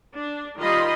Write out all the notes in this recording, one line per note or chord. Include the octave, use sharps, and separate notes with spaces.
D4
D#3 G3 F4 D#5 B5 C6